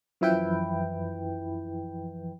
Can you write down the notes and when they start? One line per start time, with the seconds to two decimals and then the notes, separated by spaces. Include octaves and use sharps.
0.21 F#2 E3 F3 E4 B4 G5